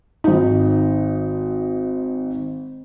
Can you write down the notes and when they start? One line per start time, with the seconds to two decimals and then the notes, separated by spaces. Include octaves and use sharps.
0.24 G#1 D#4